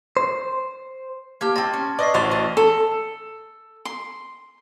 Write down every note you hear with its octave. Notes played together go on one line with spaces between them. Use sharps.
C5
A#3 G4 A5 F6 G#6
C4 D#5 A5 C6 A6
C#4
B4 D5 D#5 C#6 C7
A1 E4 F#4 C5 C6 A6 F7 G7
D#5
A4
C6